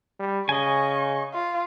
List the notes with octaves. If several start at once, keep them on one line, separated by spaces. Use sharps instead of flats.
G3
C#3 D#5 G#5 C#6
F4